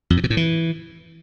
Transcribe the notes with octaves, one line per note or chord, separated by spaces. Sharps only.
F2
G#2
B2
A2
E3